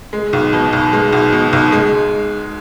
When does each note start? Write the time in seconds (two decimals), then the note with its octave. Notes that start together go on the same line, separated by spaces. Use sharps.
0.13 G#3
0.33 B1
0.53 B2
0.73 B1
0.93 G#3
1.13 B1
1.32 B2
1.53 B1
1.72 G#3